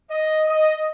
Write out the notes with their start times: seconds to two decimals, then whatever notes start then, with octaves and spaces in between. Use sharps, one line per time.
0.11 D#5
0.49 D#5